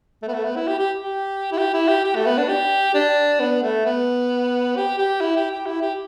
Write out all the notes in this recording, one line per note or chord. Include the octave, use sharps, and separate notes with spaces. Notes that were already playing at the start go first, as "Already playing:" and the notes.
A3
B3
A3
B3
E4
G4
G4
G4
E4
G4
E4
G4
G4
A3
B3
D4
G4
D4
B3
A3
B3
G4
G4
E4
G4
G4
E4
G4